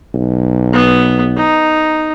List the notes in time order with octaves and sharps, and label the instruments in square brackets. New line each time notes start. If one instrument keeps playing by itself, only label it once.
[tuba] B1
[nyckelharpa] B3
D#4